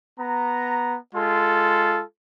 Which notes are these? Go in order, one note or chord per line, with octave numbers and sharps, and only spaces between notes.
B3 A#5
G#3 F4 A4